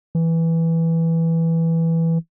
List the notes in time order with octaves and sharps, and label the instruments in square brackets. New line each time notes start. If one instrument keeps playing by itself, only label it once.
[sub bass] E3